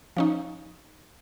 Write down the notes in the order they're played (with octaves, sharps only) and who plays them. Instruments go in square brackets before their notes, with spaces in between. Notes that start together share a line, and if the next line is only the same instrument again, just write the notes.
[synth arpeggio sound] F3 C#4 D#4